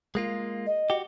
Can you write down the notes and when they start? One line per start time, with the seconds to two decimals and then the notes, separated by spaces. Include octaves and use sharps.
0.15 G#3 A#3 F4
0.66 D#5
0.90 F#4 G4